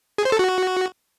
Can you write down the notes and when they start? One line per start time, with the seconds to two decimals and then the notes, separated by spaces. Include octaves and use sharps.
0.18 G#4
0.25 C5
0.32 A4
0.39 F#4